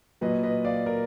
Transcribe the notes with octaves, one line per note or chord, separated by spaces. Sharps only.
A#2 F#3 B4 D#5
B4 D#5
D5 F5
A#4 D5